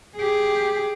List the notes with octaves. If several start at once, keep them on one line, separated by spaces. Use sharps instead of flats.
G4 G#4